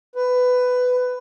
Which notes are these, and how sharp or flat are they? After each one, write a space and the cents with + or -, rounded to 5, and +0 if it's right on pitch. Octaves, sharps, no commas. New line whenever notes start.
B4 +15